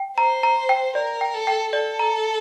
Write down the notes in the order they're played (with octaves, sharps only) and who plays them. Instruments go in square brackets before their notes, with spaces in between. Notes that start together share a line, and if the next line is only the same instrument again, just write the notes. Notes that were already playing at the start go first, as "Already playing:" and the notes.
Already playing: [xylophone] G5
[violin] C5 [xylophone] A#5
[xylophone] A#5
G5
[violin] A#4 [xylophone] D5
[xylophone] G5
[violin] A4
[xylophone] G5
[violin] A4 [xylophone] D5
[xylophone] A#5